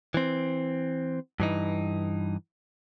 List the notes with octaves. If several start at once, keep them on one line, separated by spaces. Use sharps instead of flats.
E3 C4
G2 E3 D#4